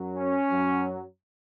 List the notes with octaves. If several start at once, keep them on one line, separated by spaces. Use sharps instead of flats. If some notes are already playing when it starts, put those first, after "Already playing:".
Already playing: F#2 F#3
C#4
F#2 F#3